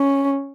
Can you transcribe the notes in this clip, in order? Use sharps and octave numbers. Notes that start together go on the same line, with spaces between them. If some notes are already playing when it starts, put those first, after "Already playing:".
Already playing: C#4